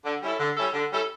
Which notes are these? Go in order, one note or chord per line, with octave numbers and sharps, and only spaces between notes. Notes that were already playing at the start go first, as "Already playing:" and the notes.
D3
G3 C#4 E4 A4
D3
G3 C#4 E4 A4
D3
G3 C#4 E4 A4